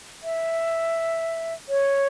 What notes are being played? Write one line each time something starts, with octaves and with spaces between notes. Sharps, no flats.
E5
C#5